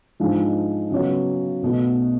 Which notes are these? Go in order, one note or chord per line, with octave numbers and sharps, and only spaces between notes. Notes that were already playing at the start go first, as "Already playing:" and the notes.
G#2 F3 G#3 D4
C#3 F#3 B3 F#4 C#5
B1 B2 A3